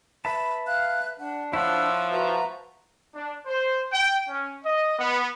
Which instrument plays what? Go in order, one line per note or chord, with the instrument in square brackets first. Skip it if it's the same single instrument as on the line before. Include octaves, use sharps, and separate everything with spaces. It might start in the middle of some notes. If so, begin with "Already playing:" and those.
[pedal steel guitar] B4 E5 A5 [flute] B5
[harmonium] F5 [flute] F#6
[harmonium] D4 [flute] F#5
[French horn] F3 [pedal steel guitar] E4 C#5 F#5 [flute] E6
[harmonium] F#4 B4 A#5 [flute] E5
[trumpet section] D4
C5
G5
C#4
D#5
B3